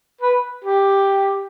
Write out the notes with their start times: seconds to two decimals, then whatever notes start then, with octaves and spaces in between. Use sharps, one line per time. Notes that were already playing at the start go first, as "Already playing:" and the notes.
0.21 B4
0.64 G4